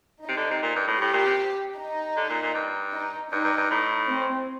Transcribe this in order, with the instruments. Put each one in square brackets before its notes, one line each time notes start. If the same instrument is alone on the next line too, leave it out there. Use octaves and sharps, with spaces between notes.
[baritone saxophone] C3 [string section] D#4
[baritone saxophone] D3
C3
A#2
G2
A2
[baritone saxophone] A2 [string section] G4
[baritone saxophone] A#2
C3
[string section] D#4
[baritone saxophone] D3
A#2
A#2
G2
[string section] D#4
[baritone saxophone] G2 [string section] D#4
[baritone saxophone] G2
G2
A2
[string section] C4